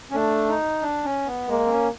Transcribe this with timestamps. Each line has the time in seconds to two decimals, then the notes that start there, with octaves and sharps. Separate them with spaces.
0.11 C#4
0.15 A3 D4
0.49 D#4
0.82 D4
1.04 C#4
1.26 B3
1.49 G#3 A#3
1.66 C4
1.71 C#4